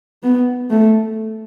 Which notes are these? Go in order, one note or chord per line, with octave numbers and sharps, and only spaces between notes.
B3
A3